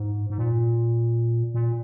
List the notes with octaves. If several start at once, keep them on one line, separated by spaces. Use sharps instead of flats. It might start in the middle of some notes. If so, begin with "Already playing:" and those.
Already playing: G#2
G#2
A#2
A#2